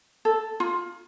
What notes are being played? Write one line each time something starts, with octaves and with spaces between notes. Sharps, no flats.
A4
F4